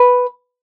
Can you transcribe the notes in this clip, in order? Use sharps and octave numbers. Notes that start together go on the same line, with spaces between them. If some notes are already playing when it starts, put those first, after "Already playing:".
Already playing: B4